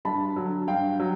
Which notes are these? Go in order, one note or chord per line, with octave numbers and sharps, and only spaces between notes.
G2 A5 B5
D3 F#3
G2 F5 G5
F#3